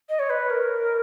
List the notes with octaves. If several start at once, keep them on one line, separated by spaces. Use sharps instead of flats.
D#5
C#5
B4
A#4